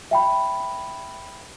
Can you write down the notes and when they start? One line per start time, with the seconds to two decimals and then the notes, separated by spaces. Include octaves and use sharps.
0.11 E5 G5 B5